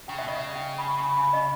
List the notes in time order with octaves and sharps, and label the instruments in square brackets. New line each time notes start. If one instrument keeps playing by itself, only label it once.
[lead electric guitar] C#3 [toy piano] G5
[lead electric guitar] B2 [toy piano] E5
[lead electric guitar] C#3 [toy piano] D#5
[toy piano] E5
G5
B5
B5
B5
D#5